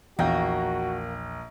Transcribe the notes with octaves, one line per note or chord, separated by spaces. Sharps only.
A#1 E2 A#3 F#4 G5